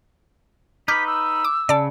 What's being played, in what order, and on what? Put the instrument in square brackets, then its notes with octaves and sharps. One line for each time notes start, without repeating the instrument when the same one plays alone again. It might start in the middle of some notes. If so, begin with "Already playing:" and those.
[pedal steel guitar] D#4 B4 [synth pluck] D6 F6 G6 [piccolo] B6
[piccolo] E6
[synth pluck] D6
[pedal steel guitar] C#3 [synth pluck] D5 A5